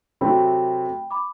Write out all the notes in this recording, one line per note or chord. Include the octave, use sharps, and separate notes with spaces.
C3 F#3 A3 C4 G5 B5
B5 D6